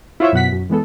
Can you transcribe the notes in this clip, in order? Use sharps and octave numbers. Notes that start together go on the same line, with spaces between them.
E4 F4 C5 C#5 E5
F#2 B2 F#5 B6
F#2
E3 G#3 B3 A4